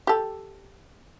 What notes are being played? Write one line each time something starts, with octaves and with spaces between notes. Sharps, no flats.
G4 A4